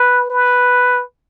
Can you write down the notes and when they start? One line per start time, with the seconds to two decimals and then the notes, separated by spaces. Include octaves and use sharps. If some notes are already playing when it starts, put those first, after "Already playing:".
Already playing: B4
0.30 B4